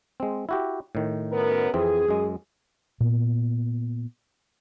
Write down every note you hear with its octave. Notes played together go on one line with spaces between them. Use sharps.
G#3 C4
E4 F#4 G4
A2 D#3
F#2 B3 A#4
F2 E3 C4 G#4
F#2 G#3
A#2 B3